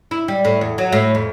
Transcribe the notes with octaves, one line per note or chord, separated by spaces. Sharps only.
E4
G3
A2
E2
F#3
A2
F2